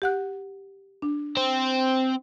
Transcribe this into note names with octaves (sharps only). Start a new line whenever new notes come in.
G4 F#5 F#6
D4
C4